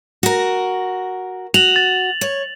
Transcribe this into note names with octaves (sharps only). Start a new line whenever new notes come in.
F#4 A#4
F#4 F7 F#7
A6
C#5